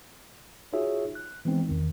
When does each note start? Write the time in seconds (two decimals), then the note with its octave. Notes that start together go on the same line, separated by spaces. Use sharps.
0.73 D#4 F4 F#4 G#4 C#5 E5
1.15 F#6
1.45 E3 G#3 B3 C4 D#4
1.69 E2 D#3